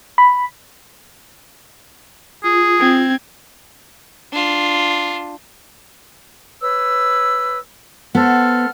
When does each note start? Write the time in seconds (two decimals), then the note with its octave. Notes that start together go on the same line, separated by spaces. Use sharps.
0.18 B5
2.44 F4 G#4
2.80 C4 G#6
4.32 D4 F4
6.61 B4 C#5 E6
8.15 B3 A4 C5 F6